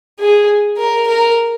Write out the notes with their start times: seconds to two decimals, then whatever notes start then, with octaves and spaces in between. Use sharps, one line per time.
0.20 G#4
0.77 A#4
1.07 A#4